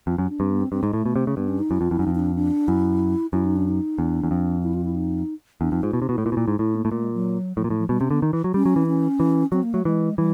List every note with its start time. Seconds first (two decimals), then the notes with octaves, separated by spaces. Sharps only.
0.07 F2 F4
0.18 F#2 F#4
0.29 D4
0.40 G2 C4
0.51 B3
0.61 C4
0.72 G2 C4
0.83 G#2 G#3
0.93 A2 A3
1.06 B2
1.16 C3
1.27 C#3
1.37 G2 B3
1.48 C#4
1.59 D#4
1.70 F#2 E4
1.81 F2 F4
1.91 F2 E4
1.99 F#2
2.03 D#4
2.07 F2
2.15 D#4
2.19 D4
2.35 D4
2.68 F#2 E4
3.33 F#2 E4
3.45 D#4
3.56 D4
3.68 D#4
3.98 E2 D4
4.23 E2
4.31 F2
4.63 E4
4.74 F4
4.85 E4
4.96 D#4
5.61 E2 D4
5.72 F2 D#4
5.83 G#2 F4
5.92 B2 E4
6.01 C3 D#4
6.09 B2 E4
6.18 A2
6.26 A#2
6.32 B2
6.37 A#2
6.48 G#2
6.59 A2 E4
6.75 A#3
6.85 A2
6.92 A#2 A3
7.03 G#3
7.14 F#3
7.56 A2 F3
7.64 A#2
7.67 F3
7.70 A2
7.79 F3
7.89 B2 G3
8.00 C3 C#4
8.11 D3 B3
8.22 D#3
8.33 E3
8.44 F#3
8.54 G3 C#4
8.66 F#3
8.76 E3
8.87 C#4
9.20 E3
9.52 F#3 C4
9.63 A#3
9.74 F#3 A3
9.85 E3 G#3
10.18 E3 G3